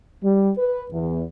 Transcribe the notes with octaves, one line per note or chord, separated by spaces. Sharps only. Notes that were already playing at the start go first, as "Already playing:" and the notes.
G3
B4
E2